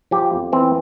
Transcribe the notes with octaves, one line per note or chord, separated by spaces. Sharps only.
F3 G4
F2
E3 C4